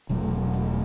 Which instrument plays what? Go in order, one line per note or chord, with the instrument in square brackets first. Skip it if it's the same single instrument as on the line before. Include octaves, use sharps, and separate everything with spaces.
[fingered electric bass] E1 B2 F#3 A3